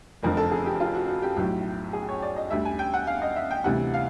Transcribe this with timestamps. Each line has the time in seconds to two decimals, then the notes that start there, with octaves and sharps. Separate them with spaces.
0.23 F1 F2 D3 F3 A#4
0.37 A4
0.51 G#4
0.66 G4
0.80 F4
0.95 F#4
1.08 F#4
1.22 G4
1.37 B1 A2 F#3
1.93 G#4
2.09 C#5
2.22 D5
2.36 D#5
2.50 D2 D3 G3 E5
2.65 G#5
2.79 G5
2.94 F#5
3.07 F5
3.22 D#5
3.36 E5
3.51 G5
3.64 D2 C3 E3 G3 F#5
3.94 F5